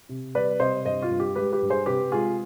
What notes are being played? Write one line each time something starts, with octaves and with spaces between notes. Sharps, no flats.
C3
G3 B4 D5
C3 C5 D#5
G2 C5 D#5
F4
G2
G4
G#3 G4 B4
G4 B4
G2
G#4 C5
C3 G4 B4
G#3 F4 G#4